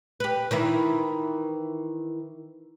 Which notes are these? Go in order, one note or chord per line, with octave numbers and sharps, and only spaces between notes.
G4 B4
D#3 E3 E4